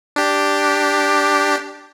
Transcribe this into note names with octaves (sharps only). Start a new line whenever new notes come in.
D4 G4